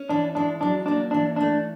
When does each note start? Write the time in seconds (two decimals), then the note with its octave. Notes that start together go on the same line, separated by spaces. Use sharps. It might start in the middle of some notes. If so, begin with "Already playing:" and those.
Already playing: C#4
0.09 E3 D4
0.35 G#3 D4
0.61 F#3 D4
0.86 A#3 D4
1.11 E3 D4
1.36 A3 D4